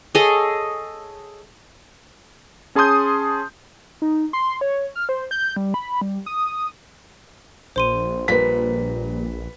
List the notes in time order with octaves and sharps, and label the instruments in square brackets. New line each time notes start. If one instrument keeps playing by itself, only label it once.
[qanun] G#4 A4 C#5 D#5
[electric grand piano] C#4 G#4 A5 C6 D#6 G6
[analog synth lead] D#4
C6
C#5
F6
C5
G6
G3
B5
G3
D#6
[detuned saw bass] A#1 [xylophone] C5 C6 D#7
[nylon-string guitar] A#2 G3 [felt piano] B4 B6